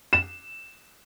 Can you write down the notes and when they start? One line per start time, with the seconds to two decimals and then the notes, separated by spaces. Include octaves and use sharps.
0.13 E7